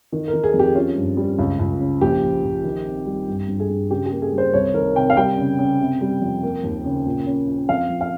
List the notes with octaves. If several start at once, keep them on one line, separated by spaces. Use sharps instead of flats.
D#3
A#4
D#3
G#4
F2
G4
C#4 F4
G2
G3
C#2
C#2
C#3
A#1 G4
A#1
A#1
D#3
C4
G3
G2
G2
G#4
G2
C#3 G4
G4
A#3
G#4
G3
C5
C2 C#5
D#3 A#4
C3 G5
F5
G3 G5
C#3
C#3
C3
G3
F2
A#3
D#2
C#3
A#2
C#4
F4
F2 F5
F3
F5